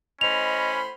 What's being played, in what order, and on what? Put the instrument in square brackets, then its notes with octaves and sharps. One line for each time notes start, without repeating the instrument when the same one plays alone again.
[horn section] A2 C5 B5 [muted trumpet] C#4 [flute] D#5 [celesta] F7